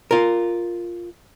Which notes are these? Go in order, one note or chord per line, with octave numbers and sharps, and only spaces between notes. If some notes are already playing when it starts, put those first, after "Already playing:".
F4 A#4